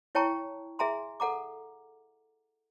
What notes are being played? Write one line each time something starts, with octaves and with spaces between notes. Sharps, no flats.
E4 C#5 G5 A5 A#5 C#6
G#4 E5 G#5 A#5 C6
A4 F#5 A#5 D6